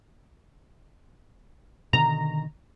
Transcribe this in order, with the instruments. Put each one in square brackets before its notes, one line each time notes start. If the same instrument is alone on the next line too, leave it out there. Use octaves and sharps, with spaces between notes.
[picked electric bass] B2 D3 D#3 [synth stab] A#5